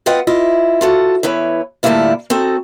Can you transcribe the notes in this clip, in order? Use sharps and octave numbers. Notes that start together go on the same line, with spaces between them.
C4 F4 B4 D#5 F#5 G5
E4 F4 D#5
F4 F#4 A4
E2 E4 B4 C#5
A2 D3 G3 A#3 E4 F4
C4 D#4 F#4 A4